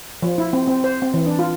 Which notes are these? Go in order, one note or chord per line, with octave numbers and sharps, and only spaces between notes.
F3
E4
C4
C4
C5
C4
E3
D4
F4